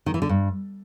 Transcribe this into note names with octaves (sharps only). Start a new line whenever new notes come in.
D#3
E3
D3
G2